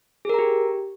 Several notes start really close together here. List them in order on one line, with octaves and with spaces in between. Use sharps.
G#4 A#4 A#5 G4